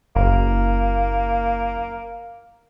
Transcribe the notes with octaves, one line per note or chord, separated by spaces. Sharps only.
F#1 A#3